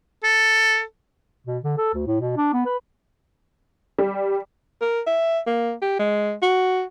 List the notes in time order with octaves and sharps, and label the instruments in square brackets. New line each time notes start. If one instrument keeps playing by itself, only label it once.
[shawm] A4
[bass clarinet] B2
D3
A4
D2
A2
B2
D4
B3
B4
[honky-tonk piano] G3
[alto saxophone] A#4
E5
A#3
G4
G#3
F#4